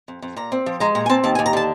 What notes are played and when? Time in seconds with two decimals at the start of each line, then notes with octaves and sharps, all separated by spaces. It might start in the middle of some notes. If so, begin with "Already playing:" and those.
0.08 F2
0.22 F2
0.36 A#2 A#5
0.52 C4
0.66 F3
0.80 G#3 A#5
0.95 A#2 A#5
1.06 G#5
1.10 C4 A5
1.24 D#2 A5
1.35 G#5
1.39 D#2
1.46 A#5
1.53 D3 A5